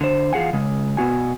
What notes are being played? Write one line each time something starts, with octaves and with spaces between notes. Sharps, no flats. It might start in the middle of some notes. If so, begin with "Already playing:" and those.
D3 C5
E2 F4 G#4 F#5 G#5
C#3 G#3
B2 B3 F#4 G#5